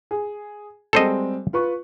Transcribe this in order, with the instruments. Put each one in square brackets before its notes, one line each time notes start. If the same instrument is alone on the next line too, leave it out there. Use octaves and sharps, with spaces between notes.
[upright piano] G#4
[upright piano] G3 G#3 C4 [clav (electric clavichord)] A4 C5 D#5
[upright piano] F4 B4 C#6